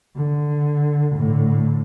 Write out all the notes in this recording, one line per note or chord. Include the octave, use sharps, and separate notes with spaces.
D3
A2 D3